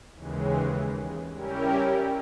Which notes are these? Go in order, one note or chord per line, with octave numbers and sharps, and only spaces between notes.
D#2 C#3 E3 G#3
G3 C#4 E4 G4 A#4